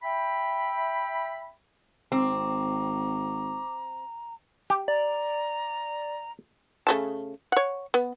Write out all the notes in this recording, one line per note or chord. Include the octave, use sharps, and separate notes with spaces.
E5 G5 B5
G#1 C4 A#5 C#6 D6
G4
D5 A#5
C#3 A3 A5
C#5 F#5
B3